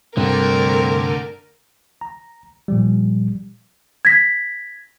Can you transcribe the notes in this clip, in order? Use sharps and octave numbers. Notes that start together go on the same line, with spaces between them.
C2 G2 D3 A3 C4 A#4
A#5
A#2 F3 G3
G#6 A#6 B6